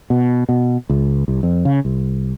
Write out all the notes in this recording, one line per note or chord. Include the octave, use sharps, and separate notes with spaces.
B2
B2
C#2
C2
F2
C#3
C2